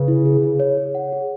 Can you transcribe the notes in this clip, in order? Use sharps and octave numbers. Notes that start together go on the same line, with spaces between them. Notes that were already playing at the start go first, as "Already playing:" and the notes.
Already playing: C#3 B4
E4
G#4
G#4
C#5
G#4
F#5
G#4